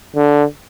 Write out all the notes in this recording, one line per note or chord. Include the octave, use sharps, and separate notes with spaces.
D3